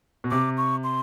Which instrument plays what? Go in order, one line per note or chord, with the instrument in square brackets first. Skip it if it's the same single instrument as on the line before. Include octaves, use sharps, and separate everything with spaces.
[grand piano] B2
[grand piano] C3 [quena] D6
[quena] C#6
C6